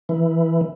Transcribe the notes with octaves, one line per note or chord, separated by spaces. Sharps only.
E3